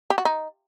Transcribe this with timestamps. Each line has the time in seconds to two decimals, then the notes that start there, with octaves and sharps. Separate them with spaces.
0.10 G4
0.18 F#4
0.25 D#4